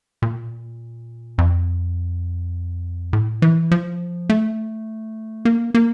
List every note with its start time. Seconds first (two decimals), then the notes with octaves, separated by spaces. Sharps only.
0.22 A#2
1.38 F2
3.13 A2
3.42 E3
3.71 F3
4.29 A3
5.45 A#3
5.74 A#3